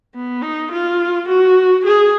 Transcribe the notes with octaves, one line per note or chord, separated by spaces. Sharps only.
B3
D#4
F4
F#4
G#4